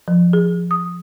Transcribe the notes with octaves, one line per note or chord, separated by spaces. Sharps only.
F3
G#4
D#6